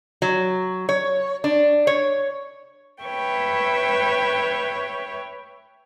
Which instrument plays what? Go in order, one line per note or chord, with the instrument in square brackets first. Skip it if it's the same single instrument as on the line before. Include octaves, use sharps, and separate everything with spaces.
[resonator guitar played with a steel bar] F#3
C#5
D4
C#5
[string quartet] B4 C#5 E5 G5